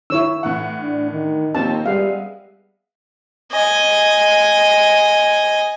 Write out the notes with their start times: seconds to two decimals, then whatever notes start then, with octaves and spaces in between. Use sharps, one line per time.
0.10 D#3 E4 C#5 E6
0.43 A2 E3 F#5
0.81 D4
1.11 D#3
1.55 D#2 F3 C4 C#4 A5
1.86 G3 G#3 B3 E5 F5
3.52 D#5 G#5